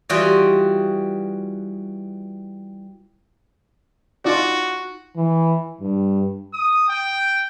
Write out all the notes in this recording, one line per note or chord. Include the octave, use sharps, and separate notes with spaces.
E3 G3 F4 F#4 D#5 G5
D#4 F4 F#4 D5
E3
G2
D#6
G5